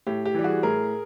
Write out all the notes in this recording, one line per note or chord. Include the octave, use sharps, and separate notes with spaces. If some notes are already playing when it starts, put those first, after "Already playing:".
A2 G4
G4
E3 G3
F#4 G#4
A2 G#4 A#4